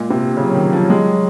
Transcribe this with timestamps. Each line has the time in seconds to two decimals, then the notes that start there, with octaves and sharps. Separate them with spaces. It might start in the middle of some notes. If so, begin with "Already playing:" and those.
Already playing: A#2 G#3
0.10 C3
0.37 C#3 F#3
0.55 D#3
0.73 F3
0.90 G#3